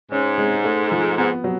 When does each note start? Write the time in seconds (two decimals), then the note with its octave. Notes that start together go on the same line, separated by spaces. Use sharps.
0.11 G#2 C#4
0.38 G#3
0.64 A3
0.92 F3
1.17 G#2 B3
1.44 F#3